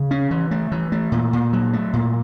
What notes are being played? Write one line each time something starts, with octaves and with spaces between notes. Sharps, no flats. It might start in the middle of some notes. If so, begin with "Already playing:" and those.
Already playing: C#3
C#4
E3
A3
E3
A3
A#2
A#2
F#3
A3
A#2